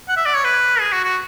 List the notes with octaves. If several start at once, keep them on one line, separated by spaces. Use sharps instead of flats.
F#5
E5
D5
C#5
B4
G#4
F#4
F#4